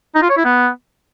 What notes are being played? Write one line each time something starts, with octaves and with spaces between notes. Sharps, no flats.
D#4
F4
C#5
E4
B3